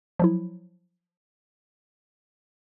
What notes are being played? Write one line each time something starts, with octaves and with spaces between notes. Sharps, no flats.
F3 F#3 E4